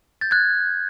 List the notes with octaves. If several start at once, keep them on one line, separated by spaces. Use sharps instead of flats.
G6 A6
F#6 G#6